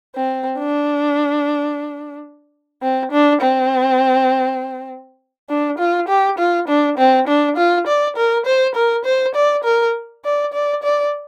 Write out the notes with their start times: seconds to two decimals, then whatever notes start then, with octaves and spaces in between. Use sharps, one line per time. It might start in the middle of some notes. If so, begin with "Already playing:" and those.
0.15 C4
0.59 D4
2.82 C4
3.12 D4
3.41 C4
5.49 D4
5.79 F4
6.08 G4
6.38 F4
6.68 D4
6.98 C4
7.28 D4
7.57 F4
7.87 D5
8.16 A#4
8.46 C5
8.75 A#4
9.05 C5
9.35 D5
9.64 A#4
10.24 D5
10.53 D5
10.83 D5